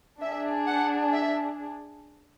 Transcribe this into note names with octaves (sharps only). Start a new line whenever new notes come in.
D4 G#4 E5
F#5
E5